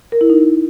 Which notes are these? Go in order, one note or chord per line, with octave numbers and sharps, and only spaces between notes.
A#4
E4
D#4